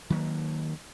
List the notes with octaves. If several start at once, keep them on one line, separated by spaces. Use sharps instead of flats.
D#3 F#3 G3 A#3